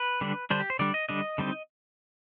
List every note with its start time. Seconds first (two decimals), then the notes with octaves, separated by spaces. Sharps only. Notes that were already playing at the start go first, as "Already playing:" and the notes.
Already playing: B4
0.21 D3 G3 D4
0.50 D3 G3 D4 C5
0.60 G4
0.70 C5
0.79 D3 G3 D4 D5
0.94 D#5
1.09 D3 G3 D4 D#5
1.38 D3 G3 C4 D#4